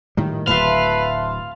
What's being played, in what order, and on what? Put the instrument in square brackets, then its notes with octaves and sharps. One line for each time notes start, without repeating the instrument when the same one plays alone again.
[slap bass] A2 G3 [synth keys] D#3
[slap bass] D1 A2 F#3 [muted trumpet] B4 [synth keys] E5 A5 C6 [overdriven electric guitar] F5